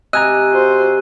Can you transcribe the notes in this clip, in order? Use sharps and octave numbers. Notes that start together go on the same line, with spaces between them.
C3 D#5 G#5 A#5 E6 F#6 D#7
F#4 C5